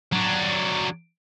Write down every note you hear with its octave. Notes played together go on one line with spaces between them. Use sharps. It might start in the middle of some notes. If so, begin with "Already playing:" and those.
F#3 D4